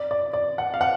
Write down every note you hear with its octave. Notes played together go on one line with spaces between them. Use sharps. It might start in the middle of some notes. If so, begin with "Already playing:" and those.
Already playing: D5
D5
D5
F#5
F5
F#5